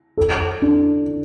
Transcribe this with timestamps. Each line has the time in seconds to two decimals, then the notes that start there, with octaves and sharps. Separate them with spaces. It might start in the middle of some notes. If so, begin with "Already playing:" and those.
0.17 A4
0.62 D4